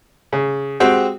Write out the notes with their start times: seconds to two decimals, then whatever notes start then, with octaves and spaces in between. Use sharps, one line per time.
0.33 C#3
0.80 G#3 C4 F#4 G4